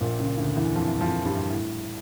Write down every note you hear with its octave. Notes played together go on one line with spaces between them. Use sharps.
A#1 A#2
C#2 C#3
D2 D3
E2 E3
F2 F3
F2 F3
G2 G3
A2